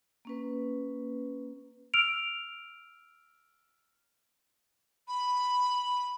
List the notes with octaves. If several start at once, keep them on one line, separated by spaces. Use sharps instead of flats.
A#3 C#4 B4
E6 F6 D7 F7
B5